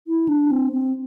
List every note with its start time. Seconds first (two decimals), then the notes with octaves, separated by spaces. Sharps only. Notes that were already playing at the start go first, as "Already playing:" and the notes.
0.08 E4
0.29 D4
0.51 C4
0.72 C4